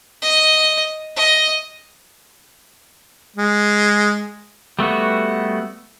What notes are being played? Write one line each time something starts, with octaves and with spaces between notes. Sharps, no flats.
D#5
D#5
G#3
G3 A3 B3 F#4